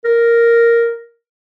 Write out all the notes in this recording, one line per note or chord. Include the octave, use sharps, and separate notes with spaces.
A#4